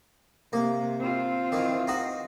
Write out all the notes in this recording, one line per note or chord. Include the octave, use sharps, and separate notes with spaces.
C3 A#3
C4 F4
D#3 E3
D#4 F#4